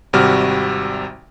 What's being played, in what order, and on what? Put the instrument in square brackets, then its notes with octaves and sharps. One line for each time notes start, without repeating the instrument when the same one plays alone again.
[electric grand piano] G#1 C3 G3 F#4 F6